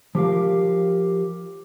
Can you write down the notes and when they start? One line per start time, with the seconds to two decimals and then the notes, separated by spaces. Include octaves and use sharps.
0.15 F3 G4 A#4 F5